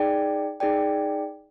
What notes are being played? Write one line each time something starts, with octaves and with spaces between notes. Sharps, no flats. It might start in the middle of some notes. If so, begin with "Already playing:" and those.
Already playing: D#4 G#4 D5 G5
D#4 G#4 D5 G5